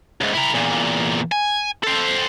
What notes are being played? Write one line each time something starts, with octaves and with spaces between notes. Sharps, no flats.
C#2 G#2
E4 A#4
E2 A#2
G#5
A4 C5